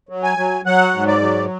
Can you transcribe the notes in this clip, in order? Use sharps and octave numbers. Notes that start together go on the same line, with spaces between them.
F#3
G#5
F#3
F#3 F#5
G#2
D5
F#3